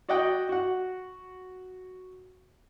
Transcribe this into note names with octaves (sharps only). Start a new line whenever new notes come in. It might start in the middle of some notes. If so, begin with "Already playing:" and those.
F#4 D5 D#5 F#5 G5
F#4 F#5